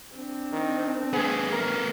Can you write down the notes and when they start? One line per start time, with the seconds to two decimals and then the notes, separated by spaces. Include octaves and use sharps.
0.15 C4 D4
0.53 D#3
1.13 A3 B3 G#4
1.52 A#4